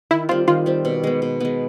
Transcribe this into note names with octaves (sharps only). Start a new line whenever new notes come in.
D#3 E4
G3 C4 F4
D#3 F4
G3 C4
B2
G#3 B3
B2
G#3 B3